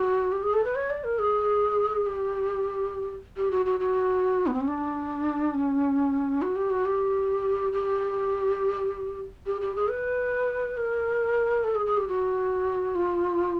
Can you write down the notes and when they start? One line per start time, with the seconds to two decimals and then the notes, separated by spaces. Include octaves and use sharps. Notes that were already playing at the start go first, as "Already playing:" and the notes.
Already playing: F#4
0.32 G4
0.43 G#4
0.54 A4
0.64 B4
0.75 C#5
0.90 D5
1.04 A#4
1.19 G#4
2.06 G4
3.37 G4
3.51 F#4
3.66 F#4
3.80 F#4
4.47 B3
4.53 C4
4.61 C#4
4.68 D4
5.54 C#4
6.42 F#4
6.56 G4
6.70 F#4
6.85 G4
7.73 G4
9.46 G4
9.61 G4
9.76 G#4
9.90 B4
10.77 A#4
11.64 A4
11.75 G#4
11.86 G#4
11.97 G4
12.08 F#4
12.95 F4